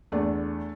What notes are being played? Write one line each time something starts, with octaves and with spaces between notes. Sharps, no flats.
E2 A3 D4